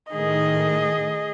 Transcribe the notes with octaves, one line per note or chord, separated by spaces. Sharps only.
A2 D#3 A3 G#4 D#5